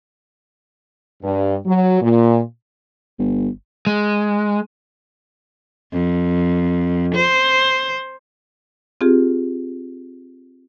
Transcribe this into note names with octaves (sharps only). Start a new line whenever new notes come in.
G2
F#3
A#2
G1
G#3
F2
C5
C4 F4 G4 G#4